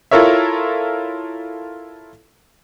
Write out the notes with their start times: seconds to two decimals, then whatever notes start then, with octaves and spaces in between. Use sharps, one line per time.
0.11 E4 F4 A4 A#4 C#5 E5